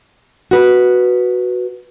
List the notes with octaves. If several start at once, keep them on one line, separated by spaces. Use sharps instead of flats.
F#4 B4